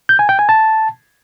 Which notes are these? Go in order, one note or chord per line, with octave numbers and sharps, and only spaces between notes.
G6
G#5
G5
G#5
A5